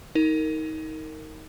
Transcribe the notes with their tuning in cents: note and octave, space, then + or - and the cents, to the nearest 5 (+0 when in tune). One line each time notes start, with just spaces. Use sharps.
D#4 +25 A#4 -20